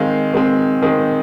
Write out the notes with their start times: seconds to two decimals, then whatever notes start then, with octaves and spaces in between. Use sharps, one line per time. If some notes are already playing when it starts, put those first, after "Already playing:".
Already playing: D#3 G#3 C4 F5
0.34 D#3 G#3 C4
0.82 D#3 G#3 C4